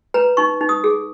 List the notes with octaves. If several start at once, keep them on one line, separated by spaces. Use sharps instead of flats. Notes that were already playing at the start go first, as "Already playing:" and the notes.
B4 A#5
D#4 C#6
D#4
D#6
G#4